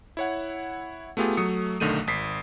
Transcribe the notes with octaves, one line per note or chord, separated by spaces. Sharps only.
E4 C#5 F#5
A3 B3 F4 G4 G#4
F#3 A3 D#6 C#7
B1 D3 D#3 A3 D#7
G#1 D#6 B6 C7